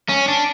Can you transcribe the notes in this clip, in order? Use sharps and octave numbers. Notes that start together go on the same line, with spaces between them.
C#4
D4